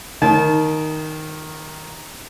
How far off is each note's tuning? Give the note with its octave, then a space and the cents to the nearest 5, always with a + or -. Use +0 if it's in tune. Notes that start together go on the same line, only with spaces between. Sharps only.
D#3 +0 A5 -30